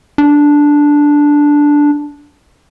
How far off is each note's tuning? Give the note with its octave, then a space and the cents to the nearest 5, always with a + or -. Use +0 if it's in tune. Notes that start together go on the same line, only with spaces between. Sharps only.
D4 -5